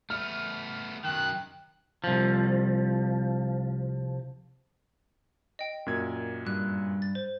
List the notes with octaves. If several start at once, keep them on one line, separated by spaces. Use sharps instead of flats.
A3 B3 F6
F#2 D#3 G5 F#6
C2 F3
D#5 G5
F#2 A#2 G#6
G2 F#6
A6
C5